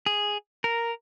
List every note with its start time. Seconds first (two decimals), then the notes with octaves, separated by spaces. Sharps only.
0.06 G#4
0.64 A#4